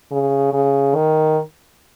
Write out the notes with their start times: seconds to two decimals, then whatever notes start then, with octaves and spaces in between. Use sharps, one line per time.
0.12 C#3
0.53 C#3
0.95 D#3